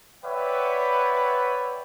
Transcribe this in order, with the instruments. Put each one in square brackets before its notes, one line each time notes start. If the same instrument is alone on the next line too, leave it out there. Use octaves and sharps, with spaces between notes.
[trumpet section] B4 C#5 D5 E5 F#5 G5